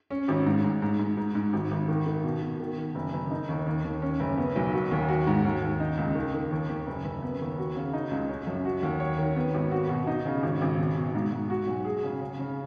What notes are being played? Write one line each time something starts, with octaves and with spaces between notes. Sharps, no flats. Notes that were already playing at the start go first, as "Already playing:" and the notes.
C#4
G#1
G#2
G#2
G#2
G#2
G#2
G#2
G#1
G#1
D#3
D#3
B2
B2
D#3
D#3
F#1
F#1
D#4
D#2
D#2
D#2
C#4
F#1
B3
B1
F#4
D#2
F#4
G#2
D#2
D#2
D#4
C#2
D#3
D#3
D#2
D#2
F#1
F#1
B3
D#2
F#4
C#3
D#4
C#2
C#4
F#2
F#4
D#2
C#5
D#3
B3
G#1
F#4
B2
D#4
C#3
G#1
G#1
B2
B2
G#2
G#2
F#4
B1
G#4
C#3
C#3
C#3